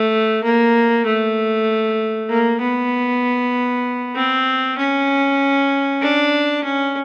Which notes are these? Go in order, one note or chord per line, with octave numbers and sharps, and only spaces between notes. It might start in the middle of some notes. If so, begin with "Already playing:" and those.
Already playing: A3
A#3
A3
A#3
B3
C4
C#4
D4
C#4